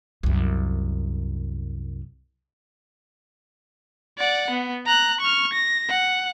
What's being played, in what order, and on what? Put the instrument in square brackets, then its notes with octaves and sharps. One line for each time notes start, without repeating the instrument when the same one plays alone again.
[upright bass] C2 F#2
[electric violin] D5 F#5
B3
A#5 F#6
C#6 F6
A#6
F#5